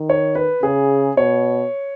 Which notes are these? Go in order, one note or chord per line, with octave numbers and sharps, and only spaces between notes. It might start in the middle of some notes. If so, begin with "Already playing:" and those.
Already playing: D#3
C#5
B4
C#3 G#4
B2 C#5